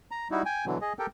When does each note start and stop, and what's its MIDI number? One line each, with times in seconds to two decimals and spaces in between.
0.11 0.28 82
0.31 0.42 55
0.31 0.42 63
0.31 0.42 64
0.31 0.42 66
0.45 0.65 79
0.45 0.65 80
0.66 0.78 47
0.66 0.78 50
0.66 0.78 52
0.66 0.78 54
0.81 0.93 68
0.81 0.93 75
0.99 1.06 67
0.99 1.06 69
0.99 1.06 70
0.99 1.06 79